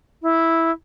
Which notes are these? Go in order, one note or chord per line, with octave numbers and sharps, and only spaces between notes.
E4